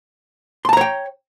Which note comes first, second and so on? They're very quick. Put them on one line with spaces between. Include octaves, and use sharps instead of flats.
C6 A5 A#5 C#5 G5